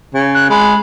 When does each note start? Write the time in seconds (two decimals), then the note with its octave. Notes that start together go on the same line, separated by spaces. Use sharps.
0.14 C#3
0.34 F#6
0.50 G#3 B5